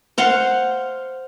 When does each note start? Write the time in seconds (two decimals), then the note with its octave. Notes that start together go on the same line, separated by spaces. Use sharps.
0.18 C5 F5 F#5 C6